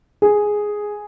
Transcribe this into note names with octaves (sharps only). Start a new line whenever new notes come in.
G#4